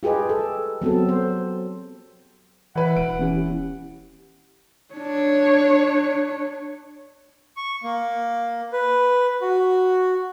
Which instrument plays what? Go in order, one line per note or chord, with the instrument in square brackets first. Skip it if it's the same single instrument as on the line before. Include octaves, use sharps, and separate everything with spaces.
[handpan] F4 G4 G#4 B4 D#5
A4
F#3 B3 C4 A4
C5
[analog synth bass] E3 [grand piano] E4 B4 [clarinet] F#5
[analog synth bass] E1 [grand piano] D7
[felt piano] E3 C#4 G4
[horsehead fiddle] D4 C#5
[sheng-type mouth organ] C#6
A#3
B4
F#4